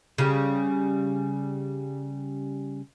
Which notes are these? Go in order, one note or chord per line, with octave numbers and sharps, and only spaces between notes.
C#3 G3